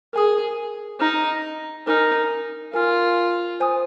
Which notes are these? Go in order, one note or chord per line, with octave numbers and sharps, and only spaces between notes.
G#4 A#4 G#5 D#6
D#4 D#5 A#5 F6
D#4 A#4 G#5 F6
F4 A#4 G#5 F6
C5 G#5 D#6